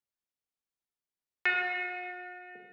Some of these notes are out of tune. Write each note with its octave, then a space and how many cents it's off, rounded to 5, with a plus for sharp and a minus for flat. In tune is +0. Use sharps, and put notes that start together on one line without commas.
F#4 -45